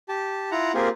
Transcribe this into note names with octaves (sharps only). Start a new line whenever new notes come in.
G4 A5
E4 F4 F#5 A#5
A#3 C4 F4 G4 G#4 A#4